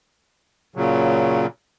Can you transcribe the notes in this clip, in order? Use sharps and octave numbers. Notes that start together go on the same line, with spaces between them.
A#2 C#3 F#3